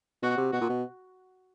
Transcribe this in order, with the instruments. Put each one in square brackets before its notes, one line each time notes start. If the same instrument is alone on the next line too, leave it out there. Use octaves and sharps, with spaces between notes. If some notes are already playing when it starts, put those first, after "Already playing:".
[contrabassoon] B2 [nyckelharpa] F#4
[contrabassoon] C3
[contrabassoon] B2 [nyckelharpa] F#4
[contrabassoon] A#2
B2